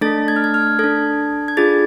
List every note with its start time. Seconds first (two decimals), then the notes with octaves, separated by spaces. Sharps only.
0.01 A3 D4 A4 A6
0.28 G#6
0.36 F6
0.44 G#6
0.54 F6
0.79 D4 A4 G#6
1.48 G#6
1.57 D4 F4 G#4 A6